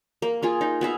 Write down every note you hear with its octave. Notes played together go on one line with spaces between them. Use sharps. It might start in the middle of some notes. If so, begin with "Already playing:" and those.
A#3
A#3 F4 G#4
D#4
B3 G#4 E5 F5